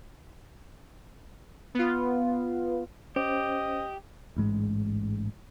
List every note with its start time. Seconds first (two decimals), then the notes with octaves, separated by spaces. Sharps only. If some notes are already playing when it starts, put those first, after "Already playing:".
1.75 B3 F4
3.16 C#4 G4 C5 D#5
4.37 A1 G#2 G#3